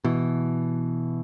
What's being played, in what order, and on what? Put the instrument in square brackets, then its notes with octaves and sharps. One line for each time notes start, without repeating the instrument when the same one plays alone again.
[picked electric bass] B2 E3